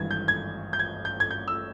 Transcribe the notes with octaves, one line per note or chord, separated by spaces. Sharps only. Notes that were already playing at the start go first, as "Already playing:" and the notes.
Already playing: G#1 G2 E3 G#6
G6
G#6
G6
G#6
G6
G#6
G6
E6